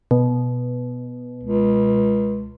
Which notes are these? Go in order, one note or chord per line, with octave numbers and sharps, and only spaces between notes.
B2
C#2